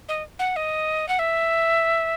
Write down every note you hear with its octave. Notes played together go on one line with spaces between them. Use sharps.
D#5
F#5
D#5
F#5
E5